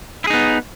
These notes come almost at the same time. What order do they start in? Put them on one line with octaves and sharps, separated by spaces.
E4 G#4 D#4 B3